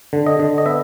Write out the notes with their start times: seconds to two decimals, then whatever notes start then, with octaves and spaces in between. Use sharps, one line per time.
0.13 D3
0.27 D#5
0.40 D3
0.58 D#5
0.66 B3 E5